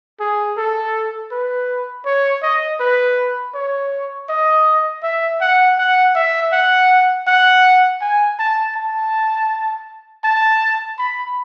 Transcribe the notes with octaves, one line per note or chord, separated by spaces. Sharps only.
G#4
A4
B4
C#5
D#5
B4
C#5
D#5
E5
F#5
F#5
E5
F#5
F#5
G#5
A5
A5
A5
B5